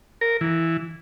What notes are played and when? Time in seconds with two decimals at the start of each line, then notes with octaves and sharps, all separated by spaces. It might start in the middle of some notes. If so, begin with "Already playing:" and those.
0.21 A#4
0.41 E3